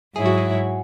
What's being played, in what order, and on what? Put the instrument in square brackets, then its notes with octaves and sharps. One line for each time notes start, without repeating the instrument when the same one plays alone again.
[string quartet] G#2 F#3 E4 C#5 [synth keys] G#4
[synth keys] F#4
G#4